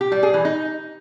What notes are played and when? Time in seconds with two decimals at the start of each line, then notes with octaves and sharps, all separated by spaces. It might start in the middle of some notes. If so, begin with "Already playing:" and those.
0.01 G4
0.12 G3
0.23 G#4
0.34 E3
0.45 D#4